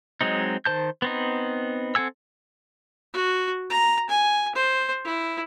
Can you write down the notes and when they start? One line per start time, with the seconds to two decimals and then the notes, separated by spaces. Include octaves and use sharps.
0.21 F#3 G#3 C4 D#4
0.65 D#3 C5 A5 G6
1.02 B3 C4 D#4
1.95 C4 A4 F#5 G#5 E6
3.13 F#4
3.70 A#5
4.09 G#5
4.55 C5
5.04 E4